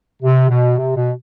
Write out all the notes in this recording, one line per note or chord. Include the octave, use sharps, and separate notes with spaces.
C3
B2
C3
B2